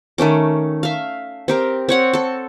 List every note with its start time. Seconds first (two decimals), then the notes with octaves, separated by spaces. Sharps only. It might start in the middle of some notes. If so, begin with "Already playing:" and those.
0.18 D#3 A3 C#4 D6
0.83 E5 F5
1.48 C4 G4 A#4
1.89 C4 C#5 F#5
2.13 A4 A5